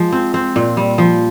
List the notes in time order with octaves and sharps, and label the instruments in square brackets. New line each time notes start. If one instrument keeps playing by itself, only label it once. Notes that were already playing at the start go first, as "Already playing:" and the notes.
Already playing: [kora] F3 G#3
C4
C4
A#2
G3
F3